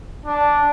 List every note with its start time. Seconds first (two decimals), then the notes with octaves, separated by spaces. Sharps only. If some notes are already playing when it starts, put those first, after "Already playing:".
0.26 D4